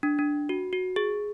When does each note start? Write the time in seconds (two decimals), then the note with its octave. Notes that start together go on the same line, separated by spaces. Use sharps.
0.03 D4
0.19 D4
0.49 F#4
0.73 F#4
0.96 G#4